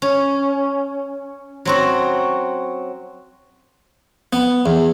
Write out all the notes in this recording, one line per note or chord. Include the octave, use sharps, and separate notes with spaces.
C#4
F#3 C4 F#4
B3
E2